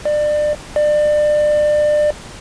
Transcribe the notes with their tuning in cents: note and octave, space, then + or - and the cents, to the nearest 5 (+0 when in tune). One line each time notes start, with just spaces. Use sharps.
D5 +30
D5 +30